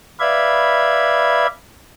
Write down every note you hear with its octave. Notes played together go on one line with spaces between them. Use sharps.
B4 D5 E5 F5 B5 G#6